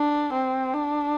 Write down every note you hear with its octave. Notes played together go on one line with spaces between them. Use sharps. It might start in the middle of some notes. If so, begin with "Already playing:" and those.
Already playing: D4
C4
D4